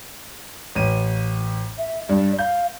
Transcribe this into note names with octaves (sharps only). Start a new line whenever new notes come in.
A1 D#7
E5
G2 D5
F5 G6